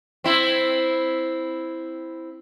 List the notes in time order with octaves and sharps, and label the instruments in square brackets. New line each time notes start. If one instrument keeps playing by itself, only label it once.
[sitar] C4 E4